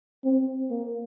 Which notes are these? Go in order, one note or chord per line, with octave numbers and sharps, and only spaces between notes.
C4
A#3